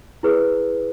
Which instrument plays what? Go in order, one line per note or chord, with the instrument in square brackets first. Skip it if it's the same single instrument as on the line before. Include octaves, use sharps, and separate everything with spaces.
[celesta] E4 G#4 B4